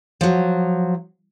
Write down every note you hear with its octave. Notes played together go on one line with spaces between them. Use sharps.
F3 F#3